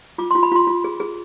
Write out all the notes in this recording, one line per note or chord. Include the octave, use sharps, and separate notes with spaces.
F4 D6
F4 C6
B5
F4 C6
F4
G#4
G#4